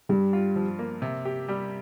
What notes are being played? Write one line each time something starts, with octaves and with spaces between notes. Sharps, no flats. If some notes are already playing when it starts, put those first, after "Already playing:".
G2 G3
F4
F3
A#3
C3
G4
G3